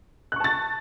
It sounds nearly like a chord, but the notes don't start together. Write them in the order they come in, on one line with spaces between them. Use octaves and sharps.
F#6 C#6 A5 A6